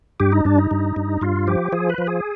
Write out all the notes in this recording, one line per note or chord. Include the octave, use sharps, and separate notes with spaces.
G2 G4
D#4
G2 D4
D#4
G2
G2
G2 F4
F3 G4
F3 G#4
B4
F3
G#4